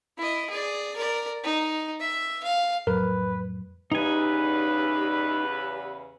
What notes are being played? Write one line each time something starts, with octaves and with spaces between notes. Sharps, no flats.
E4 D#5
G#4 D5
A#4 D5
D#4
E5
F5
F2 A2 F#3 A#4 B4
E2 C#3 D#4 G4 B4 G#5